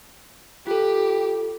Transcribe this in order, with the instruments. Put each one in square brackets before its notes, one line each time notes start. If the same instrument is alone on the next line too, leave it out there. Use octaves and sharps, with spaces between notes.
[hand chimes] F4 A4 [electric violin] G4